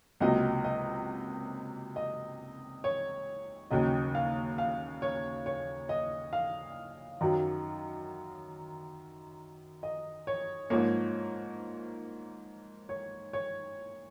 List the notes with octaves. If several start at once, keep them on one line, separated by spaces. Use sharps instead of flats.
C#2 C3 F#3 A#3 D#5
D#5
D#5
C#5
D#2 C#3 F#3 D#5
F5
F5
C#5
C#5
D#5
F5
F#2 D#3 F#3
D#5
C#5
G#2 F3 A#3 C#5
C#5
C#5